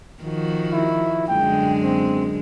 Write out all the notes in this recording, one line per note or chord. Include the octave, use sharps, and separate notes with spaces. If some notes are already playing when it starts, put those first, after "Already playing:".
D#3 F3 F#4
E4
F#2 D3 G#3 G5
C4